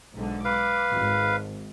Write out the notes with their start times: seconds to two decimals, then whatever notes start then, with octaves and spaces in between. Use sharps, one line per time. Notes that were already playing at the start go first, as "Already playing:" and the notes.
0.15 B1 G#2 D3
0.45 B4 F5 D6
0.90 G#1